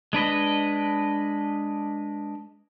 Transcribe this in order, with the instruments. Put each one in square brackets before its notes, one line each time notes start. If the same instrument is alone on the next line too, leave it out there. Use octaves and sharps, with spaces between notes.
[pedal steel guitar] G#3 D4 B4 D#5